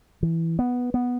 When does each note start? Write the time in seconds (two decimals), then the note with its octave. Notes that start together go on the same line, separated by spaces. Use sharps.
0.23 E3
0.59 B3
0.94 B3